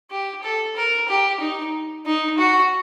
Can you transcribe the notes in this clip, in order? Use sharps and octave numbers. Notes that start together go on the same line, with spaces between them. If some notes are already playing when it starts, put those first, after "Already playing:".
G4
A4
A#4
G4
D#4
D#4
F#4